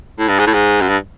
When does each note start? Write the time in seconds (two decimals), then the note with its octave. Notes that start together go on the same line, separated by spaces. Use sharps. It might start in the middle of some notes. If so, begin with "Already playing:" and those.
0.19 A2
0.29 G2
0.39 G#2
0.47 A2
0.54 G#2
0.81 F#2
0.89 G2